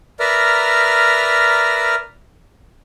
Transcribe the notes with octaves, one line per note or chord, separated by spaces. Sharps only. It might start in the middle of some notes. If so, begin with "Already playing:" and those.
A#4 B4 D5 E5 A#5 F6